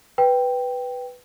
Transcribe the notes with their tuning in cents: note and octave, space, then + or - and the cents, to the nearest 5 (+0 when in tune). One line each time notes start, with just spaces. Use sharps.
B4 +0 G5 +0